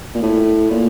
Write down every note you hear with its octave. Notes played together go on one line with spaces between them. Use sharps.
A#2
A2
A#2